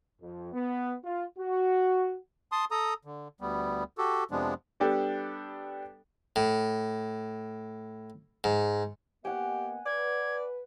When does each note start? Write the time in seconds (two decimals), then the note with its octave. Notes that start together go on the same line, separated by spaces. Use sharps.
0.22 F2
0.53 B3
1.04 F4
1.39 F#4
2.52 A5 C6 D#6
2.71 A4 A#5 D#6
3.05 D3
3.41 D2 G3 B3
3.98 F#4 G4 A4
4.31 F2 C3 F3 G#3 B3 D4
4.80 G3 B3 D4 G4 A4
6.36 A2
8.44 G#2
9.25 A#3 B3 G4 D#5 F#5 G#5
9.86 B4 D5 G#6